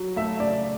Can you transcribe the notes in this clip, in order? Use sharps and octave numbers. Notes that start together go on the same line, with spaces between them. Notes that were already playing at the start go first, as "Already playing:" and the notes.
Already playing: F#3
A3 E5
C#3 D5